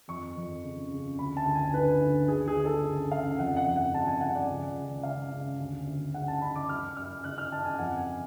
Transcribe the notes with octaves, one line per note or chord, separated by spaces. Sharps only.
F2 C#6
F2
C#3
C#3
D2 B5
A5
D2
G#5
D3 B4
D3
D2 G#4
G#4
D2
A4
C#3
C#3 F5
F2 F#5
F#5
F2
F#5
C#3 A5
G#5
C#3 F#5
D5
C#2
C#2
C#3 F5
C#3
D2
D2
C#3 F#5
A5
C#3 B5
D6
F#2 F6
F#2 F6
C#3 F#6
F6
C#3 A5
G#5
F2 F#5
G#5